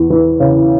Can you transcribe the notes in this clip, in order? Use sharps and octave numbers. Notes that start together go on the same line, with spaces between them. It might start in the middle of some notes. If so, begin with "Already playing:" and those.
Already playing: E2
E3
C#3